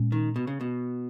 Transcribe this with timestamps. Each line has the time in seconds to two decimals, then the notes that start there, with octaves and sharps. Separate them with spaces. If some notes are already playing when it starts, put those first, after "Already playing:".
Already playing: A#2 G#3 C#4
0.12 D#3
0.36 B2
0.47 C#3
0.61 B2